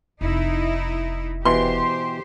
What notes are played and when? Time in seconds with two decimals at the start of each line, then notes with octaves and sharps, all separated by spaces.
0.21 F1 D#4 E4
1.45 B2 E3 G4 C5 C6